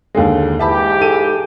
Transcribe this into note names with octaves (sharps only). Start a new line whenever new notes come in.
D#2 D3 G#3
G#2 E3 G4 E5 A5 B5
G#4 A4 D#7